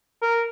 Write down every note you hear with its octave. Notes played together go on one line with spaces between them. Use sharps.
A#4